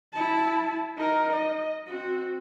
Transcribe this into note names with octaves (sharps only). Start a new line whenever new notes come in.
E4 A5
D#4 A#4
D#5
C4 F#4